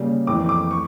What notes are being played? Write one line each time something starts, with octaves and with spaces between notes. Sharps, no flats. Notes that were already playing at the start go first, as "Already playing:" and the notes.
Already playing: C#3 G3 A#3
F2 E3 A3 D6
D6
C#6